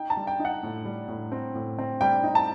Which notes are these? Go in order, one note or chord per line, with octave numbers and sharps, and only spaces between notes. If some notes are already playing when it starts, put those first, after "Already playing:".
Already playing: D#4 G5
A5
G3
G5
D#4
F#5
A2
G3
A2
C4
A2
C4
G3 G5
D#4
A5